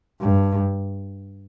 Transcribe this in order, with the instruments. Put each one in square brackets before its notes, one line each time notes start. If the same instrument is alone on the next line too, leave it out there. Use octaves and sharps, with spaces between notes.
[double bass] G2